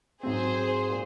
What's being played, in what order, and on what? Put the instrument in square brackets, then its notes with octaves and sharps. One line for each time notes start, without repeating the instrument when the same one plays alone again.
[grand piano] G#2 F#3 C4 [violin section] G#4 C5
[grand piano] A#2